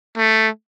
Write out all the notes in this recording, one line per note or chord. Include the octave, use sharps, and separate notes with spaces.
A3